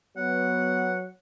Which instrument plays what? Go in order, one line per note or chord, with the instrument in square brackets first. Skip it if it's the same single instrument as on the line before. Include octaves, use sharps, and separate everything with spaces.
[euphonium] F#3 [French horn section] B3 [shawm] F#5